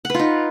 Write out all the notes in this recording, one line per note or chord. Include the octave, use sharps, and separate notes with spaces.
D#4 F4 B4 F#5